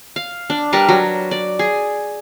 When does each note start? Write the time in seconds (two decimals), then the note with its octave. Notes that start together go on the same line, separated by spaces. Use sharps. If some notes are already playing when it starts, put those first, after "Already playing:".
0.16 F5
0.50 D4
0.73 G3 A#4 B4 A5
0.89 F#3
1.31 D5
1.59 G#4